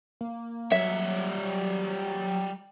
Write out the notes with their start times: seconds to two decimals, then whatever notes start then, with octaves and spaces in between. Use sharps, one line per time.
0.21 A#3
0.72 F#3 G3 C#5 E5